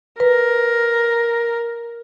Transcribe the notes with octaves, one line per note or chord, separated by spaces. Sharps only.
A#4 B4